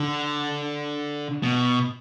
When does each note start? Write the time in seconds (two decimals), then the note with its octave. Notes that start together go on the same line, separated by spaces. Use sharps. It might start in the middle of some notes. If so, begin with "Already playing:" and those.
Already playing: D3
1.43 B2